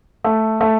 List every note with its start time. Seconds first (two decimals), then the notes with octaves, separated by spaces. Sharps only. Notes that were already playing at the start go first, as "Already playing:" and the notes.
0.24 A3
0.61 A3